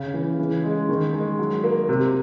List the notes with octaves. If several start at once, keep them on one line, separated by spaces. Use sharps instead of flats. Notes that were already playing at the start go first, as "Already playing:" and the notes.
Already playing: C#3
E3
E3
G#3
D#3
G#3
F#3
A#3
C3